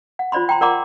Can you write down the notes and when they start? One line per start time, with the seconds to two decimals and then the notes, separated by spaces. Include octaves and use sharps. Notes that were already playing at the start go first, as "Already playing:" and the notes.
0.19 F#5
0.32 F4 C5 D5 B5 C6
0.49 G5 A#5 C6
0.61 A#4 D5 F#5 A#5 C6 D6